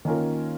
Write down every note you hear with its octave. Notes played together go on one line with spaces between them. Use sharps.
D#3 A#3 C#4 F4 A#4